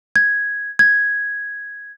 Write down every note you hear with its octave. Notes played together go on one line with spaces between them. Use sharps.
G#6
G#6